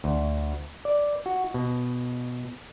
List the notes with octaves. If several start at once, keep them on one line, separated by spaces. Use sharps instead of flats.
D2
D5
F#4
B2